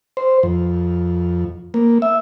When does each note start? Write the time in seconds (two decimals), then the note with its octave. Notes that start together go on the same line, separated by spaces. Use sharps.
0.17 C5
0.43 F2
1.74 A#3
2.02 E5